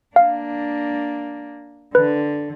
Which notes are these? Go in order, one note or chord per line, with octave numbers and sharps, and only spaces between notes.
A#3 D4 F5
D3 B4